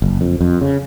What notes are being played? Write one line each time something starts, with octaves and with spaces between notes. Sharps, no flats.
F#1
F2
F2
C#3